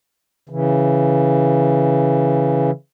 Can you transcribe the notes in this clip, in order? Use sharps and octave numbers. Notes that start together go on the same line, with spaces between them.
C#3 E3